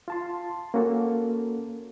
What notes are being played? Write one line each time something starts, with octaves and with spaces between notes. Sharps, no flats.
F4 A5 C6
A#3 C#4 F#4 A4